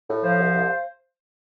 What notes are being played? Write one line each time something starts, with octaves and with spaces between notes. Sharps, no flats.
A2
F3 C5 F5
C2
C2